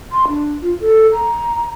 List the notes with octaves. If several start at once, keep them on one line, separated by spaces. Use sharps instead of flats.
C6
D4
F4
A4
A#5